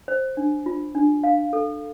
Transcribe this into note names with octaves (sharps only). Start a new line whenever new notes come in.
C5
D4
F4
D4
F5
A4